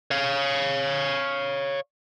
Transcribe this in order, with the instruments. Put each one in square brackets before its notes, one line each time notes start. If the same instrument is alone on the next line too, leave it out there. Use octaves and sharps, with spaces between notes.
[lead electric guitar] C#5 F5